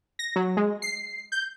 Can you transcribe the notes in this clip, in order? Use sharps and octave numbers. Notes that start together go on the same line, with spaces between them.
A#6
F#3
G#3
C7
G6